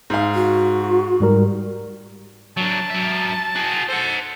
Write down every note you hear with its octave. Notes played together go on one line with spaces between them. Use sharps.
G#2 F5
F#4
G#2 G3 A#4
F#3 D4 A5
F#3 E5
F#4 G#4
A4 C5 F#5